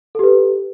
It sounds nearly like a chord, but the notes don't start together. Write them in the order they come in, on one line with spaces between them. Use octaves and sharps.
A4 G4 B4